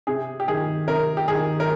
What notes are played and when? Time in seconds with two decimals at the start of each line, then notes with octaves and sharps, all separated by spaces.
0.07 C3 G#4
0.40 G4
0.48 D#3 G#4
0.87 C3 A#4
1.17 G4
1.28 D#3 G#4
1.60 A#4